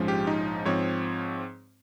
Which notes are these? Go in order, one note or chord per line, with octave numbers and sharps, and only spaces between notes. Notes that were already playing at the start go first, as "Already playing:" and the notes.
Already playing: A#1 G#2 F3 G#3 C#4
G4
D#4
G#2 F3 C4 C#5